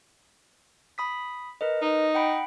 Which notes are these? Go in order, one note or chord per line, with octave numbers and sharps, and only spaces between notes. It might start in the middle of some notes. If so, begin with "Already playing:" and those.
B5 D#6 B6
A#4 B4 D#5
D#4
F#5 G5 B5